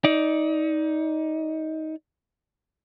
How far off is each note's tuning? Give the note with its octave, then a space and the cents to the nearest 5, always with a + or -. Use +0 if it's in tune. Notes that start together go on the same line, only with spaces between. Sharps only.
D#4 +20 D5 +0